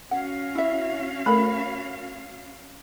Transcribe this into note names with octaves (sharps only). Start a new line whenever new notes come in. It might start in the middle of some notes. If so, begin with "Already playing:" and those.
C#4 F#4 F5 F#5
E4 E5
A3 A4 A#4 B5